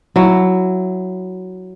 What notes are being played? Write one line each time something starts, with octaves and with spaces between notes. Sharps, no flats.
F#3 E4